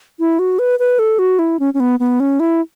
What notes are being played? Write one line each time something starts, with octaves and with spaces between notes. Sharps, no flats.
E4
F#4
B4
B4
A4
F#4
E4
C#4
C#4
B3
B3
C#4
E4